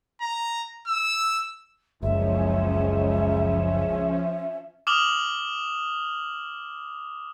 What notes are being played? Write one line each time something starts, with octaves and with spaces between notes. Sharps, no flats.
A#5
E6
F#1 C#2 F3 C#4 E5
D6 D#6 F6 F7 F#7